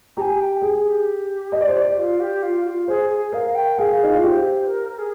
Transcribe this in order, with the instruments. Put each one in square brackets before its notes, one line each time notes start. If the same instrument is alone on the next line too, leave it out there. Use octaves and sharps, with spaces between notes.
[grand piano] G4 [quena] G#5 A#5
[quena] G5
[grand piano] G#4
[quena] G4
[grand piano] D#5
D5
C5
D5
[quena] F4
G4
F4
G4
F4
[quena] G#4 [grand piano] C5
[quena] G#4
[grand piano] A#4 [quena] F5
[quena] G5
[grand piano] G#4 [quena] F5
[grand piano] D#4
F4
[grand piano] G4 [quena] D#5
[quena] C5
A#4
G#4